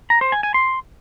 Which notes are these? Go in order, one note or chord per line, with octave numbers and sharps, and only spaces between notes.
A#5
C5
G#5
G#5
C6